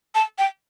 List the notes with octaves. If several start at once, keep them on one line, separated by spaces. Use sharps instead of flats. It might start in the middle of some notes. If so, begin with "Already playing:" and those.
A5
G5